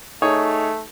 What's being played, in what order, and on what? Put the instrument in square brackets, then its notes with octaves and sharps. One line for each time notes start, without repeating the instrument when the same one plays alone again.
[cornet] A3 [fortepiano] D#4 G#4 C#5